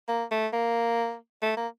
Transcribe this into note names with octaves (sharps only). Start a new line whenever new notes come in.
A#3
A3
A#3
A3
A#3